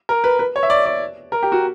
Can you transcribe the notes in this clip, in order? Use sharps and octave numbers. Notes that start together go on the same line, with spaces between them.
A#4
B4
B4
C#5
E5
D5
D5
A#4
G4
F#4